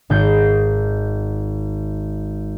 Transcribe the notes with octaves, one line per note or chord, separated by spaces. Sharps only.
G#1 G6 C7